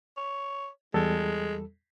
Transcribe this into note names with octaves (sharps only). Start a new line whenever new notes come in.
C#5
E2 G3 G#3 A4